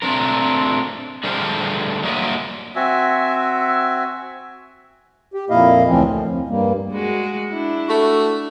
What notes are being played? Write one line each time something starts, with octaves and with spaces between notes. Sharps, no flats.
A3 C4 D4 A#4
D3 G3 A3 G#4 A#4 C5
F#3 G3 A#3 D#5 E5
C4 F#4 E5 G#5
G4
F2 A#2 A#3 E4 D#5 F5
D2 E3 F3 C4 C#4
A2
F2
G2 G3 A#3
G#3 F#4
D4 E4
A3 F#4 E5